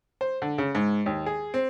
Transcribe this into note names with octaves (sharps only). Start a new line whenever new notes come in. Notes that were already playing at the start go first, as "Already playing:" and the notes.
C5
D3
C#3
G#2
D#2
G#4
C4